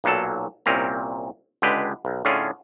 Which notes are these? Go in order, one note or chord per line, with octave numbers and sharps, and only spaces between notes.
B1 A#2 F#3 A4 A5
C2 A#2 C4 C#4 A#5
C#2 D3 G#3 G4 B4
B1
A2 D3 C#4 F4 G#4